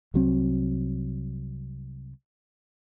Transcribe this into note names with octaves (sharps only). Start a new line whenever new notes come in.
C2 F#3 C4